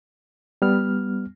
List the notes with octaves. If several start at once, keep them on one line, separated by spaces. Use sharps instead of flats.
G3 B3 F6